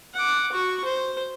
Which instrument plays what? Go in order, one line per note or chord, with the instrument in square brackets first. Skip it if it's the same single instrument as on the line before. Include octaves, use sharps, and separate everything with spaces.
[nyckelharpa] F#5 D6
F#4 C#6
C5